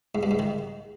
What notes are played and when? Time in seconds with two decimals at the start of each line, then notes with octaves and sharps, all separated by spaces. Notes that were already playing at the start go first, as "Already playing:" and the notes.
0.15 G#2
0.23 G2
0.31 G#2
0.39 D#3